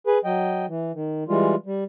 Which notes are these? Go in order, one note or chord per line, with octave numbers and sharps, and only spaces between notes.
G#4 B4
F#3 D#5 G5
E3
D#3
E3 G3 G#3 F4
G3